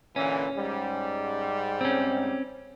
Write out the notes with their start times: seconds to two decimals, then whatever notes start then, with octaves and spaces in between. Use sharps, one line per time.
0.16 A#2 D3 E3 C#4
0.57 G#2 G3
1.81 C4 C#4